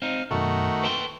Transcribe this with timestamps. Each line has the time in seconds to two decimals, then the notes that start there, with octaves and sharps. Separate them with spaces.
0.02 C4 D#4 F5
0.31 B1 F#2 D#3 A3 F#4
0.83 B4 G5 C6